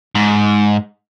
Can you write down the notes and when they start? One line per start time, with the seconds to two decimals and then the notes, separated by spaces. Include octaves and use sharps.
0.15 G#2